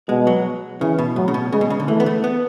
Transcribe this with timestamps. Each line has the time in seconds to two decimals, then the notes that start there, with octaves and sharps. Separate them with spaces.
0.09 B2 G#3
0.27 F#3
0.81 C#3 E3
0.99 B2
1.16 A2 F#3
1.28 C#3
1.34 B2
1.52 C#3 G#3
1.61 B2
1.70 C#3
1.80 D3
1.88 E3 A3
2.00 B3
2.06 A3
2.24 B3